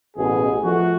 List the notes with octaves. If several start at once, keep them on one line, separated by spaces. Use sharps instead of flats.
A1 B2 G#4
F3 A3 F#4